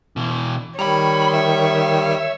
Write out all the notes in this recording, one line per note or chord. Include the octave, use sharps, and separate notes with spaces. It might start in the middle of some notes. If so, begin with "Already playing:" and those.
B2 E3
D#3 G3 C#5 A#5 B5
E5